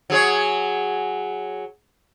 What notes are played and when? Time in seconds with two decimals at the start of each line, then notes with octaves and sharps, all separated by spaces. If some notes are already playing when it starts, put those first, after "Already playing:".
0.10 F#3 G#4 C#5